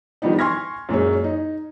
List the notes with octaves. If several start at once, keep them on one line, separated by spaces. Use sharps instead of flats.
D#3 F3 G3 B3 D4 D#4
G#5 C6 C#6 F6 G#6 A#6
F#2 A#2 G#3 C#4
D#4